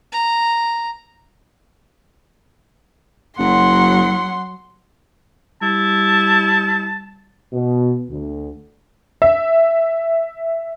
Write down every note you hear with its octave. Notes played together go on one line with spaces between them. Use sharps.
A#5
F#1 F#3 F#5 C6
G3 E4 A5
B2
D2
E5